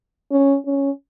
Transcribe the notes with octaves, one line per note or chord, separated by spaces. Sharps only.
C#4
C#4